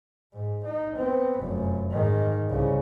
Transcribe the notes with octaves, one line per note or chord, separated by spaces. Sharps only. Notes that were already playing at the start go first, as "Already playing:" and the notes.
G#2
D#4
B3 C4
F1 F#2
G#2 D#3
C2 C#3